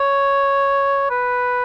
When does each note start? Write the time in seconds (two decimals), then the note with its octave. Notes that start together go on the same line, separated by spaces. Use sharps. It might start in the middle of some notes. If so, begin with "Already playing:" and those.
Already playing: C#5
1.10 B4